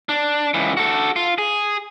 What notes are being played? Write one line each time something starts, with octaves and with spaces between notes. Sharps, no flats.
D4
C#2 E3
F#4 A4
F4
G#4